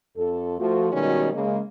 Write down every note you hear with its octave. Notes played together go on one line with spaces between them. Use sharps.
F2 A4
F3 A3 F#4
B2 D#3 G3 G#3 C#4 F#4
C#3 G#3 A#3